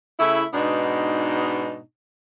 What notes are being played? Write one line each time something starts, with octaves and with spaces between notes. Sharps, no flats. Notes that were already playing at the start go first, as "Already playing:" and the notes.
C#3 A3 E4
G#2 B2 B3 D4 D#4